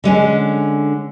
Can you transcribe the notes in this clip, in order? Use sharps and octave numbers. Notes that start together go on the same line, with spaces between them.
D3 G#3 C#4